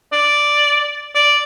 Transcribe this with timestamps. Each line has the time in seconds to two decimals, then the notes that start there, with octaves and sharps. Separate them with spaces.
0.12 D5
1.15 D5